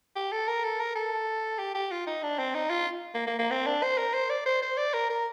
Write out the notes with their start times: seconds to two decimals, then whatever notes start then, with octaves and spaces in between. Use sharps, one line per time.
0.16 G4
0.32 A4
0.48 A#4
0.64 A4
0.80 A#4
0.95 A4
1.58 G4
1.75 G4
1.91 F4
2.07 D#4
2.23 D4
2.39 C4
2.54 D#4
2.70 F4
3.15 A#3
3.27 A#3
3.39 A#3
3.51 C4
3.67 D4
3.83 C5
3.98 A#4
4.14 C5
4.30 D5
4.46 C5
4.62 C5
4.77 D5
4.94 A#4
5.10 A#4